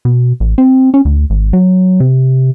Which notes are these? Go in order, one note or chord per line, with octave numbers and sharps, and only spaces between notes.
B2
A1
C4
C#4
D2
G#1
F#3
C3